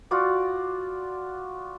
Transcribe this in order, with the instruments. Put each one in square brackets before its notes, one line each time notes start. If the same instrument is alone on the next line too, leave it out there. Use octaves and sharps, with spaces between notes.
[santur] F4 F#4 D5